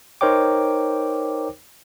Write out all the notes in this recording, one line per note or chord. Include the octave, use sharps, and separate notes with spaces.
D#4 A#4 C5 C#5 G5 D6